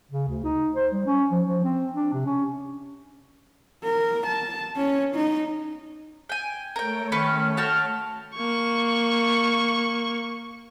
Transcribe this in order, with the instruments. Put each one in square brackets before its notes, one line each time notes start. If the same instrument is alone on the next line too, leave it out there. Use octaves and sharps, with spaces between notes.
[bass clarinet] C#3
D2
D#4
C5
G3
C#4
F3
F3
C4
D4
C3
C#4
[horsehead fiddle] A#4
A5
C#4
D#4
[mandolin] G5 G#5
[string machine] A3 A4 C#5 [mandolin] A#4 G5
[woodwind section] D#3 [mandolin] C#4 B4 C#6
[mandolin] F#4 G5 A5 [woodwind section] F6
[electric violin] A#3 C#6